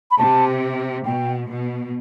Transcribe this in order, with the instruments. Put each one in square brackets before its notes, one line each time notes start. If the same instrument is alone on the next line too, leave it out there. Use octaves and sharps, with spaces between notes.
[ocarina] B5
[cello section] C3 [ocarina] A5
[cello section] B2 [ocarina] G5
[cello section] B2